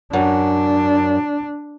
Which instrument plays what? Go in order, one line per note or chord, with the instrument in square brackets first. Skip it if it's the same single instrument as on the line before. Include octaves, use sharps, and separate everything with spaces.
[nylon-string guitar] F#2 [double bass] D4